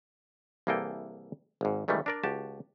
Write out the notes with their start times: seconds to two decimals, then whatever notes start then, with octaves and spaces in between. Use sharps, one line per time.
0.67 C2 E3 A#3 G#4 A4 G5
1.61 G#1 G#2
1.88 C#2 D#3 E3 G3 A3
2.06 D4 A#4 D5
2.23 C#2 F#4 G4 A5